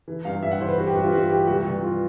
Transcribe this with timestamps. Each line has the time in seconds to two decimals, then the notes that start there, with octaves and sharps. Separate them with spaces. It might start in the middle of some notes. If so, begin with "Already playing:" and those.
0.08 E3
0.25 G2 F5
0.43 G2 E5
0.52 F#5
0.60 E3 C5
0.69 B4
0.78 E3 F#4
0.86 G4
0.95 G2 F#4
1.04 F4
1.12 G2 F#4
1.30 E3 G4
1.47 C2 F#4
1.65 C2
1.83 F3 F4